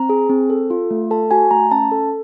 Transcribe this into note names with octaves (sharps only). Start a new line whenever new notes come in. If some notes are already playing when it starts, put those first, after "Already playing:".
Already playing: C4 A#5
G#4
C4
A4
F4
A3
A4 A5
F#4 G#5
A3 A#5
C#4 A5
A4